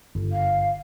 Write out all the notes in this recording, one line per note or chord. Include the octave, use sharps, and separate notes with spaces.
G1
F5